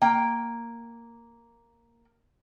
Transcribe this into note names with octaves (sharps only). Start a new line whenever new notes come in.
A#3 G5